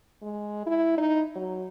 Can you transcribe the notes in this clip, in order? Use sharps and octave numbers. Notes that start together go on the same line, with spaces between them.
G#3
E4
D#4
F#3